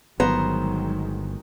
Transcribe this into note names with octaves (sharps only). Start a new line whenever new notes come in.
G1 D#3 F#3 G#3 B3 C5 A#5